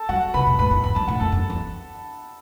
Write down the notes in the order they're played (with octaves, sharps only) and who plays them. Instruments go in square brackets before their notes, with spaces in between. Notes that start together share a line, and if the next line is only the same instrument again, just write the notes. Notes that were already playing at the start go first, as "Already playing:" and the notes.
Already playing: [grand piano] A4 A5
[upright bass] F#3 [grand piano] F#4 F#5
[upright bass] C#3 [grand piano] B4 B5
[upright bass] B2
[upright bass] A2 [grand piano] B4 B5
[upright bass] A2
[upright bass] E2 [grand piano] B5
[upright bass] F#2 [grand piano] A5
[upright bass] A2 [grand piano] F#5
[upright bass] F#2 [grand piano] A4 A5
[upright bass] F#2
E2